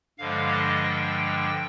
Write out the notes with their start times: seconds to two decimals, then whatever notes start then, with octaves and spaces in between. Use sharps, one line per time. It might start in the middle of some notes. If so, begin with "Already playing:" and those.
0.18 G2 D3 F3 G#3 F5
0.52 D#5
0.84 G5